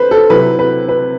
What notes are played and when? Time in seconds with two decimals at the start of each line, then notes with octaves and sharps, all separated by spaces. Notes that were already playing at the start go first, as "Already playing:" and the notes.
Already playing: D3 B4 C5
0.11 A4
0.30 C3 F#3 C4 E4 B4
0.59 B4
0.89 B4